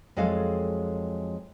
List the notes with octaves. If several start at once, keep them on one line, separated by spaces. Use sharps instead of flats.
F2 F#3 G#3 G#4 A4 F5